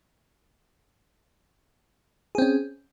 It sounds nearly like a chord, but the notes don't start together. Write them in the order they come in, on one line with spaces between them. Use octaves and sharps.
G#4 C4 C#4